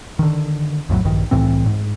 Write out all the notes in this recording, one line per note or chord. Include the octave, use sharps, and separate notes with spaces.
D3 D#3
B1 F2 A2 F#3
A#1 G2 D#3
C2 A2 E3 C4
G#2